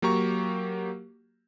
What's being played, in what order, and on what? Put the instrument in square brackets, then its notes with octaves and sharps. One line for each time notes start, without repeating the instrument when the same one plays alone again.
[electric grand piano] F#3 A#3 G4 A#5 C#6